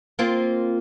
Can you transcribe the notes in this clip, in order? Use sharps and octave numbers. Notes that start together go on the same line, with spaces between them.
A#3 C4 F4